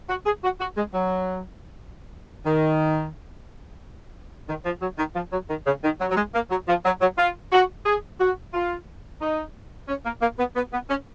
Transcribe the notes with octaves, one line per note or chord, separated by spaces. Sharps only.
F#4
G#4
F#4
F#4
G#3
F#3
D#3
D#3
F3
F#3
D#3
F3
F#3
D#3
C#3
D#3
F#3
F#3
G#3
A#3
F#3
F3
F#3
F#3
F4
F#4
G#4
F#4
F4
D#4
C#4
A#3
A#3
B3
B3
B3
C#4